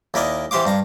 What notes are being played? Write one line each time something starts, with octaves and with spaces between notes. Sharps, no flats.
D#2 E4 A#4 D5 D#5
E3 G4 C5 F5 D6
G2 F5 A#5